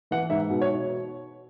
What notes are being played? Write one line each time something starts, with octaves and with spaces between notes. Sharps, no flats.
E3 F#5
G#2 E5
B2
C#5